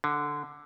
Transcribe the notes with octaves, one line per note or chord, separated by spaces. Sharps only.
D3